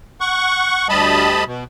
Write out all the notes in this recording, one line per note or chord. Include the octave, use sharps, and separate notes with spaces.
F#5 C#6
D2 G3 D#5 A5 B5
B2